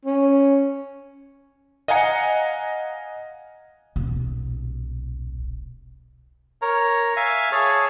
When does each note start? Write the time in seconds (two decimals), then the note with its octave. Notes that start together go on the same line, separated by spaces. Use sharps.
0.05 C#4
1.88 D#5 F5 F#5 G#5 A#5 C#7
3.96 D#1 B1
6.62 A#4 C#5 A#5
7.16 E5 F5 G#5
7.52 G#4 C#5 A5